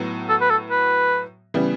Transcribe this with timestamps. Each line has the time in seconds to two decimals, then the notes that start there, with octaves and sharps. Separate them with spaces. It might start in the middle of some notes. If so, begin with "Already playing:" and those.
Already playing: A2 F#3 B3 F#4
0.29 A4
0.41 B4
0.50 A4
0.71 B4
1.54 C#3 E3 G3 B3